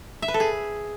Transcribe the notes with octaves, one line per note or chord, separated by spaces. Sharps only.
E5
B4
A4
G#4